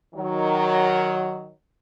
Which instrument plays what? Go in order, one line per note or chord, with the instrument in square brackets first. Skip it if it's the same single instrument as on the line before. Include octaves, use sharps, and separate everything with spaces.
[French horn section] D#3 F#3